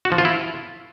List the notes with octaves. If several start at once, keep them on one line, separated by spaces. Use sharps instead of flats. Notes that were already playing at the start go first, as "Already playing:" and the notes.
F#4
F3
F4
E4